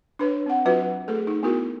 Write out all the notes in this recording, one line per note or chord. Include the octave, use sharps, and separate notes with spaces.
D4 B4 C#5
C4 F#5
F#3 F4 F#4 B4
A3 G#4 A4
D#4
B3 D#4 E4 F#4 A#4